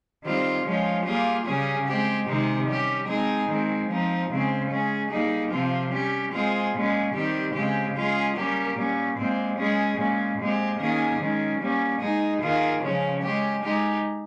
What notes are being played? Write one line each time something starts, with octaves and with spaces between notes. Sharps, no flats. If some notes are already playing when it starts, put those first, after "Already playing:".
D#3 G3 C4 F4
F3 G#3 C#4 F4
G3 A#3 F4 G#4
C#3 G3 C#4 G#4
G#3 C4 G4
C3 D#3 G#3 C4 D#4
G3 C#4 G4
G#3 C4 D#4 G#4
D#3 G#3 C4
F3 C4 D#4
C#3 G#3 C4
G#3 C#4 G#4
G3 A#3 D#4 G#4
C3 F3 C4 F4
G3 C#4 G4
G#3 C4 F4 G#4
A#2 G#3 C#4
D#3 G3 C4 G4
C#3 G#3 C4 G4
G#3 C#4 F4 G#4
G3 A#3 C#4 G4
A#2 G3 C#4
A#2 G#3 C4
G#3 C#4 G#4
A#2 G#3 C#4
A#2 G#3 C4 G4
D#3 A#3 C#4 G#4
D#3 G#3 C#4
G3 A#3 C#4
G#3 D#4 G#4
D#3 A#3 F4 G#4
C#3 F3 G#3 C#4
G#3 C#4 G4
G#3 D#4 G4